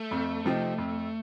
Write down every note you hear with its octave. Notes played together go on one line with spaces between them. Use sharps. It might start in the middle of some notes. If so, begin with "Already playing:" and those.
Already playing: A3
F2
C3 F3 C4 D#4
F2